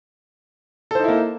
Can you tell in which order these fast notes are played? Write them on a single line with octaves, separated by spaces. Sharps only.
A4 C5 D#4 E4 A#3